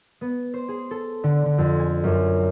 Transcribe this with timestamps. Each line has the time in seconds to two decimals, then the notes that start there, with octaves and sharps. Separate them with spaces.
0.21 B3
0.54 C5
0.69 G#4
0.91 A4
1.24 D3
1.46 D3
1.58 F2
1.79 G#5
2.04 F#2